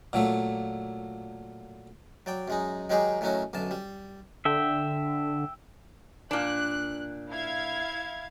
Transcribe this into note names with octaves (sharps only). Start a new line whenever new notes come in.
A#2 F#3 A3
F#3 D5 G5
F#2 G#3 D#4
D#3 F#3 G#3 D#4 G4 G#4
A2 D#3 F#3 C#4 D#4 F#4
B1 F#2 D3 A5
G3
D3 E5 G5
A#2 D4 F#6
E4 F5 G#6